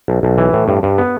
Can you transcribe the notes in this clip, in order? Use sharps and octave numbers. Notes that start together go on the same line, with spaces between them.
B1
B1
E3
A2
G2
G2
B3